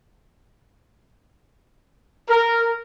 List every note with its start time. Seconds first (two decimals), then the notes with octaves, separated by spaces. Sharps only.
2.27 A#4